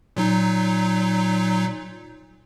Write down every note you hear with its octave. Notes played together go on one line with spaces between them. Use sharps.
A#2 F#3 D#4